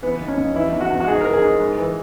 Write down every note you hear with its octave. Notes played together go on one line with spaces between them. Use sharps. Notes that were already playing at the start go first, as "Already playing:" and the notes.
E3 B3
D#2
C#4
D#2
E3 E4
E2
F#4
E2
F#4
G#2 G#4
E3 A#4
G#4
G#2
G#2
E3